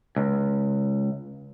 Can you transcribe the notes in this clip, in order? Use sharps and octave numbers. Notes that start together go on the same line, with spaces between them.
C#2